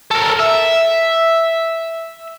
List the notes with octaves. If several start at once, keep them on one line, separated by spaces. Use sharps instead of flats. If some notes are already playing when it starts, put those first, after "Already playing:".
A4 A#4
E5